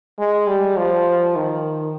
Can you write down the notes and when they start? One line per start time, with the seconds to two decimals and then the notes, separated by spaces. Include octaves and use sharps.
0.19 G#3
0.47 G3
0.77 F3
1.36 D#3